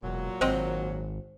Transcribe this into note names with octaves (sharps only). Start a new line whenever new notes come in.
E1 A#2 F#3
G#1 C4 C5 D#5 G5